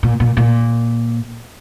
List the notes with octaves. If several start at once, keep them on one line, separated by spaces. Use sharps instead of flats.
A#2
A#2
A#2